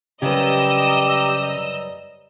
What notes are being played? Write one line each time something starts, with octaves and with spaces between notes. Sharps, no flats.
F#2 C#3 G3 G4 B4 D#5 A#5 E6